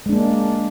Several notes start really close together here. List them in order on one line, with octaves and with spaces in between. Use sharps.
G#3 D4 A#3